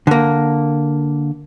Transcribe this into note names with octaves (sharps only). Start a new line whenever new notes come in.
D3 A#3